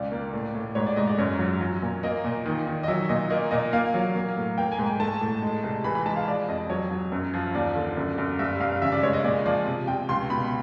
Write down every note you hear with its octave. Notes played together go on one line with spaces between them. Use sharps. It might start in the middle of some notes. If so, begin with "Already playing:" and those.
Already playing: C#2 D5
A#3
A2
A2
G#2 C#5
D5
G#2 D#5
D5
F#2 C#5
F#3
F#3
A#2
A#3 D#5
A#2
D#3
D#3
D#5
F#3 E5
A#2 D#5
A#3 D#5
A#2 D#5
A#3 F5
F#3
A#3
A2
A#3 G5
G#5
G#2
G#5
A3 A5
A2
G#3
C2
E3 B5
B5
G#3 A5
F5
F3 D5
F2 D#5
F#3 C#5
F#3
F#2
F3
D#2 D5
D3
F#2
F#2
G2 E5
G2 F5
C#3 E5
D5
G#3 C#5
D#5
A#2 D5
F3 D5
C3
C3 G5
C#2 C6
B2 B5